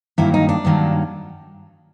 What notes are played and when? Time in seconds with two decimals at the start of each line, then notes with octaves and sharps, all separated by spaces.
0.18 G2 D#3 F#3 A#3 E4
0.34 D#4
0.49 D4
0.65 G2 D#3 F#3 A#3